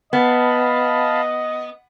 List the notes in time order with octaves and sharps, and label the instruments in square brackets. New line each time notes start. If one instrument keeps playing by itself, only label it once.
[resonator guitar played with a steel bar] B3 [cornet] D#5 [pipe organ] F5 A5 B5